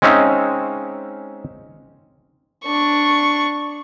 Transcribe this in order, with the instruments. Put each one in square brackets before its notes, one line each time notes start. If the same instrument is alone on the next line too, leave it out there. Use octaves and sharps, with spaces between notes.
[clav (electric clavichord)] G#3 C4 C#4 D#4 E5 F5
[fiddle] D4 C#6